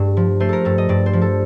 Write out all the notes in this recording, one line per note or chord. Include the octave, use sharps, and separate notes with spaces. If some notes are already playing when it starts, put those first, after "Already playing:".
Already playing: G2 A3 D5
F3
A3 C5
A4 A#4
G2 A4
D#5
G2 D5
C5
F3
A4